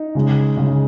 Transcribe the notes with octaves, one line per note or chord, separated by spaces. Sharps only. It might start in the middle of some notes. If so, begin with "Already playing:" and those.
Already playing: D#4
C#3 G#3
C#3 G#3